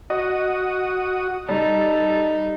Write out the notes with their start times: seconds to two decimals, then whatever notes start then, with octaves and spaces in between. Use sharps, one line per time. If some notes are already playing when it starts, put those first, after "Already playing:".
0.10 F#4 D#5 D#6
1.48 G3 D#4 A4